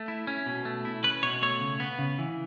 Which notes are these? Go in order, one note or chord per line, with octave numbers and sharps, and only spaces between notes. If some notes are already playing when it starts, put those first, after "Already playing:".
Already playing: A3
E4
C#4
B2
A3
E4
C#4 B4
B2 C#5
A3 C#5
C#3
B3
C#3
E3